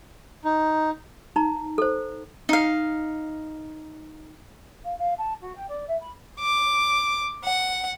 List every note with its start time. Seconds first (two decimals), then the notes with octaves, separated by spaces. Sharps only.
0.45 D#4
1.36 D#4 A#5
1.78 A4 C5
2.49 D#4 F5
4.85 F5
4.99 F5
5.18 A5
5.41 F#4
5.55 G5
5.69 D5
5.88 E5
6.00 B5
6.40 D6
7.44 F#5